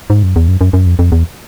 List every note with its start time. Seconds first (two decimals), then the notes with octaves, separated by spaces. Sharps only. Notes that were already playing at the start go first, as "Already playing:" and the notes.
0.10 G#2
0.23 F#2
0.36 E2
0.48 F#2
0.61 F#2
0.73 F#2
0.86 F2
0.99 F2
1.12 E2